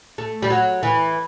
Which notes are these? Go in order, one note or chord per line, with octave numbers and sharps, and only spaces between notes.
A3
G3
F#3
E3